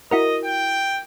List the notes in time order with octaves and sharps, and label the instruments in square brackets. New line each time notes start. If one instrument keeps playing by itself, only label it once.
[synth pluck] E4 F#4 A#4 [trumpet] D#5
[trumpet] G5